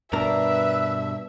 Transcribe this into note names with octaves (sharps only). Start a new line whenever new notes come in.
G2 B2 D4 A#4 B4 E5